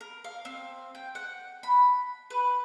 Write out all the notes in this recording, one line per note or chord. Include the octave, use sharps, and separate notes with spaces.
A#4
F5
C4
G5
F#5
B5
B4